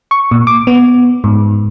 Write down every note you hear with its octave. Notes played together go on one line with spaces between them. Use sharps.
C#6
A#2
D6
B3
G#2